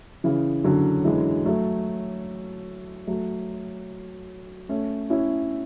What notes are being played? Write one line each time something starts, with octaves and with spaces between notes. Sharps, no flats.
C#3 E3
D3 F#3
E3 G#3
F#3 A3
F#3 A3
A3 C#4
C#4 E4